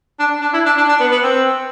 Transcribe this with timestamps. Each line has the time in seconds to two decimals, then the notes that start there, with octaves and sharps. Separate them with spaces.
0.19 D4
0.42 D4
0.53 E4
0.66 D4
0.77 D4
0.89 D4
1.00 B3
1.11 B3
1.23 C4